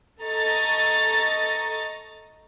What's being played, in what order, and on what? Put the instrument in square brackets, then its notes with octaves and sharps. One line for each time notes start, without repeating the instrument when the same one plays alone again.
[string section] A4 D#5 A#5 C#6 A6